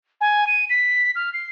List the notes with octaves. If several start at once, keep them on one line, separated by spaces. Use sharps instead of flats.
G#5
D#7
B6
F6
C7